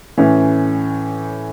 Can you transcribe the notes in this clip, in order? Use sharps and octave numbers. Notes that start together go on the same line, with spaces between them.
A2 E3 C#4